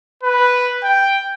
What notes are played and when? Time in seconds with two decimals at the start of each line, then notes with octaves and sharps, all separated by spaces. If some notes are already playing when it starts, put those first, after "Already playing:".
0.23 B4
0.84 G5